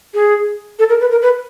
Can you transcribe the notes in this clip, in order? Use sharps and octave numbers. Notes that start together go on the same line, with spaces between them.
G#4
A4
A#4
B4
A#4
B4